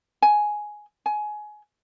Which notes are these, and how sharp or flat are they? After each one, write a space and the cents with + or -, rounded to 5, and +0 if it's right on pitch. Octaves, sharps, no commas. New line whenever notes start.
G#5 +10
G#5 +20